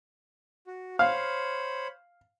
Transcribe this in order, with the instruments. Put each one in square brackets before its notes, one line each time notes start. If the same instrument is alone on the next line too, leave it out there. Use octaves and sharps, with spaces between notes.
[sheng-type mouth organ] F#4
[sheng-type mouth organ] C5 C#5 B5 [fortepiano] F5